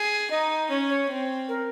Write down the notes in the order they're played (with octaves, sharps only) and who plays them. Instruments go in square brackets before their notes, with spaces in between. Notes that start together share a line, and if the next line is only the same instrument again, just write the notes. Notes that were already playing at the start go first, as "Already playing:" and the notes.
Already playing: [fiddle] G#4
[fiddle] D#4 [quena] D#5
[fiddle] C#4 [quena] C#5
[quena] C#5
[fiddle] C4
[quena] A#4